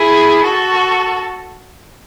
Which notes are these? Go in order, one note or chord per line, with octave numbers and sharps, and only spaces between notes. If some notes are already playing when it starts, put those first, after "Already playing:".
Already playing: E4 G#4
F#4 A4